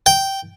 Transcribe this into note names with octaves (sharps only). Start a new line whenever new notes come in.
G5